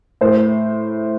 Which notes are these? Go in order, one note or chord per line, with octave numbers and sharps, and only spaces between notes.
A2 C5